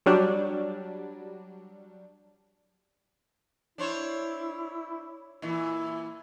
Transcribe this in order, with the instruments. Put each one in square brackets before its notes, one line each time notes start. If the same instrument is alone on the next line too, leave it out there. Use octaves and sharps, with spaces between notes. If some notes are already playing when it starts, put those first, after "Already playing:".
[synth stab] F#3 G3 D4
[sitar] D4 C5 C#5 [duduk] E4
[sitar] A#2 E3 [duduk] E4